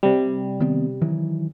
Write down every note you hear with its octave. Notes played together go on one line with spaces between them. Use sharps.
C3 G3
D#3 B3 C4
D#3 E3 F#3